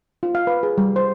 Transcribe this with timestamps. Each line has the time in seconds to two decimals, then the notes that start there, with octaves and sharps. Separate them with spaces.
0.23 F4
0.35 F5
0.47 B4
0.63 G#4
0.78 G3
0.96 C5